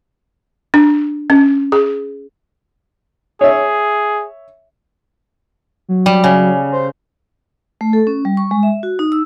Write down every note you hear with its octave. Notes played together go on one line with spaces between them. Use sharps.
D4
C#4
G#4
G#4 C#5 E5
F#3
G3
C#3
C5
A3
A4
C#4
G3
C#6
G#3
E5
F#4
D#4
E6